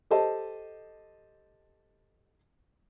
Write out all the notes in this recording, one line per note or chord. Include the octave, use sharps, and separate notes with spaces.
G4 A4 C5 D#5 A5